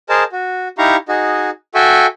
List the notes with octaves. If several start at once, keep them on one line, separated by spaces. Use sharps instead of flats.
G#4 A#4 C5 D#5 A5
F#4
D#4 E4 G4 F5 A#5 C#6
D#4 F#4 G#4 D#5
F#4 A4 E5 G5 G#5 C#6